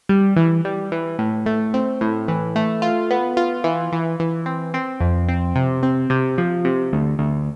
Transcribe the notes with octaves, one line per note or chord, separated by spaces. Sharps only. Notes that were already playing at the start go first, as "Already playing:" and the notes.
G3
E3
G3
E3
A2
A3
C4
A2
E3
A3
F4
B3
F4
E3
E3
E3
C4
C4
F2
C4
C3
C4
C3
F3
C3
D2
D2